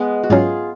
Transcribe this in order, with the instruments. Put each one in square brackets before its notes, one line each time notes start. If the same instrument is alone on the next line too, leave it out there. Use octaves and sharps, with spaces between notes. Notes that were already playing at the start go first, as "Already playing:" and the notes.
Already playing: [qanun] G#3 B3
F#4
[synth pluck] G#2 F#3 C#4 [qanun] F4 G#4